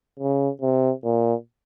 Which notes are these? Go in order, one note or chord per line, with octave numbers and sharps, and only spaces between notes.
C#3
C3
A#2